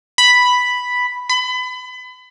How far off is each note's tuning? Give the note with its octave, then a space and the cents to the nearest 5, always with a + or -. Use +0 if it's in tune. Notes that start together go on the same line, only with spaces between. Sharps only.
B5 +0
B5 +30